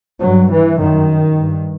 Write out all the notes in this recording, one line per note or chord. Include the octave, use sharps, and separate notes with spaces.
G2 F#3
E3
F#2 D#3
G2